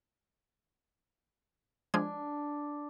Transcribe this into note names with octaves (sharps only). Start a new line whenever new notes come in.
F3 G#3 D4 G#6